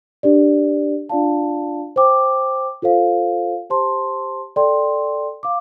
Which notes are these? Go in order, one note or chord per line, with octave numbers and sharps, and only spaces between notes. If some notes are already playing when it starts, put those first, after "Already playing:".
D4 G4 D5
D4 F4 D5 F5 A5
C5 G5 D6
F4 A4 C5 F5
G4 C5 A5 C6
A4 D5 G5 C6
F5 D6